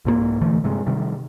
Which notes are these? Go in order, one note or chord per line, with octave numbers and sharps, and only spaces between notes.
C2 G#2 F#3 A#3
A#1 D3 E3 A3
G2 C3 G#3
C3 D#3 G3